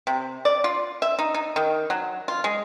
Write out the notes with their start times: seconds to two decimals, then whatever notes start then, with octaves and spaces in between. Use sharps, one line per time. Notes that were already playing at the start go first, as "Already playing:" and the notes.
0.07 C3
0.45 D5
0.64 F4
1.02 E5
1.19 D#4
1.34 D#4
1.56 D#3
1.90 F#3
2.28 F4
2.44 G#3